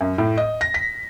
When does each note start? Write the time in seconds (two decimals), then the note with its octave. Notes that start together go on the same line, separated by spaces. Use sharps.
0.01 F#2
0.18 A2
0.38 D#5
0.61 A#6
0.74 B6